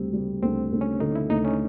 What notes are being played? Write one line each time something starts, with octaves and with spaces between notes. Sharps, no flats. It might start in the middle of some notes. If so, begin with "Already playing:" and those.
Already playing: D2 G3 C4
G3
D2 C4
D2
C#4
D3 D#4
E4
D2 D#4
C#4